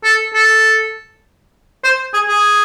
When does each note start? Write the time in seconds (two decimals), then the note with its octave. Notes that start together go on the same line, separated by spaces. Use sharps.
0.04 A4
0.34 A4
1.84 C5
2.13 G#4
2.29 G#4